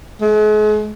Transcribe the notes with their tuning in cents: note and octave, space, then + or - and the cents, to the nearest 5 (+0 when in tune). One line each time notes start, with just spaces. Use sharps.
G#3 +40